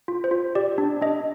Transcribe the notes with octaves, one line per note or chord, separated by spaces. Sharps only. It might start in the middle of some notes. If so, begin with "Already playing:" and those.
F4
C5
F4
G4 D5
D4
D4 D#5